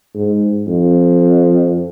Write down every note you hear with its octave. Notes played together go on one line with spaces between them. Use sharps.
G#2
F2